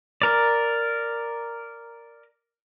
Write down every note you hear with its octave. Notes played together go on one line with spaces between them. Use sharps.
A#4 D5